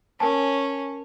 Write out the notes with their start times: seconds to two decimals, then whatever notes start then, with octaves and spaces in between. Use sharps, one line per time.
0.20 C#4 A#4 G#5 A5